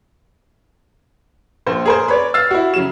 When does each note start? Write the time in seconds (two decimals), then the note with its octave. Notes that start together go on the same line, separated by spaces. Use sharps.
1.67 A#1 C5
1.86 G#4 A#4 C5
2.08 B4 C#5 D5
2.34 E6 F6 A6 C7
2.51 E4 F#4
2.74 C#3 F#3 E7